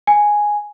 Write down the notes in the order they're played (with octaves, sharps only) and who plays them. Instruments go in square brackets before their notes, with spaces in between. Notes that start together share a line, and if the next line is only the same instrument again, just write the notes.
[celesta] G#5